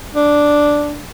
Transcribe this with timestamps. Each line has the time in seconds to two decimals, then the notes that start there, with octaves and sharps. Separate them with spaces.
0.15 D4